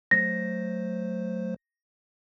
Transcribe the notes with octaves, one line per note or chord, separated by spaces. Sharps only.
F#3 A3 C5 A#6